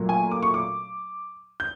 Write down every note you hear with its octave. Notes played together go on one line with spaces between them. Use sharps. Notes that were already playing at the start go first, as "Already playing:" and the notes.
Already playing: A#2 F#3 A3
G#5
D6
C#6
D6
G6